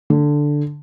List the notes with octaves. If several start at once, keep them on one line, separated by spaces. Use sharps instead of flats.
D3